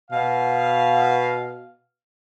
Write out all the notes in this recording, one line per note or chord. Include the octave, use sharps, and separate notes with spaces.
B2 F5